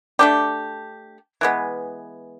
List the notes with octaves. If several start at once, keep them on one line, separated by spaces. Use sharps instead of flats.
A3 D4 G4
E3 G#3 B3